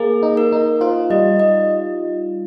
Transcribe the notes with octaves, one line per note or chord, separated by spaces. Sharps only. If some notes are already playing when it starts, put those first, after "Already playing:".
Already playing: A#3 G#4
D#4
A#4
D#4
F4 C5
G3 D#5
D#5